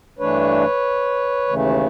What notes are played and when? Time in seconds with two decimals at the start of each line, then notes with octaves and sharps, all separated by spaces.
0.19 G2 E3 A3 D4 B4 C#5
1.48 D#2 C#3 E3 A3